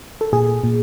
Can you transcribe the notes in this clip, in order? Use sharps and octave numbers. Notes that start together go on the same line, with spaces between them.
A4
A#2 G#4
A#2